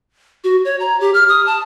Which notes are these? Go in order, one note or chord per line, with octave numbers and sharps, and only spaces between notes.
F#4
C#5
A#5
G4
F6
D#6
A5